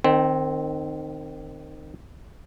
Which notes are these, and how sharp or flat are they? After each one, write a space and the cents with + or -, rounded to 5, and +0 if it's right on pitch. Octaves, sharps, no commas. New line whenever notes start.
D#3 -25 C4 +0